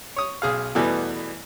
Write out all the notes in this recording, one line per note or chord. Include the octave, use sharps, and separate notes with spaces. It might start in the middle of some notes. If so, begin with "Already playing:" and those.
C#5 D#6
B1 G#4 F5
E2 B2 E3 G3 A3 B3